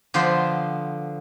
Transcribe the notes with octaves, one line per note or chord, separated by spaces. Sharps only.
D3 F3 B3 C5 C6